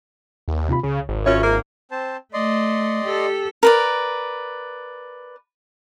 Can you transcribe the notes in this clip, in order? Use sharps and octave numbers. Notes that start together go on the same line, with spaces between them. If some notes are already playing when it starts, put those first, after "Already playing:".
D#2
C3 F4 B5
C#2 C#3
G#1
F#2 C#4 F4 C#5 E5
A#3
C4 C5 A5
A3 D5 D#5 C6
G4 A4
A#4 B4 D5